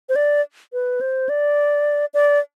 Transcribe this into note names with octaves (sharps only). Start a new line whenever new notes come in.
C5
D5
B4
C5
D5
D5